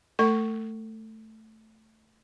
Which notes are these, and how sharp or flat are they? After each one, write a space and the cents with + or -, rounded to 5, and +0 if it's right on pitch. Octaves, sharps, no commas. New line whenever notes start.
A3 +0 A4 +35 C#6 +0